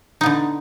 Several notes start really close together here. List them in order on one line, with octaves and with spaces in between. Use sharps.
D#4 B3 D3